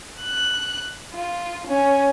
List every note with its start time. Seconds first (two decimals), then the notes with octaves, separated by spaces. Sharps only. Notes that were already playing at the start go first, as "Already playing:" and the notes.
0.22 F#6
1.14 F4
1.67 C#4